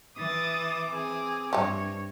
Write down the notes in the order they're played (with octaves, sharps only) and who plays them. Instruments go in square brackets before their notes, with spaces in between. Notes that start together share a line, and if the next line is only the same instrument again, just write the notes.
[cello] E3 [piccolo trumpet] D6 [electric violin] D#6 A6
[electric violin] C4 G#4
[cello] G2 [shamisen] E3 F3 [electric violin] C#5